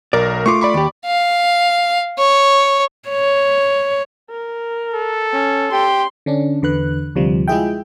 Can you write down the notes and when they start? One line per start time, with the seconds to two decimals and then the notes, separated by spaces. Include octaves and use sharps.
0.13 B1 A#4 D5
0.46 A3 F4 C#6 D6
0.61 D5 B5 C#6
0.74 D#2 G4
1.06 F5
2.18 C#5
3.09 C#5
4.30 A#4
4.94 A4
5.33 C#4
5.72 G4 C6
6.26 D3 C#4 D4
6.62 E2 D3 B4 F#6
7.15 D2 C3 F3 G3
7.48 G#3 E4 F4 G#4 E5 G5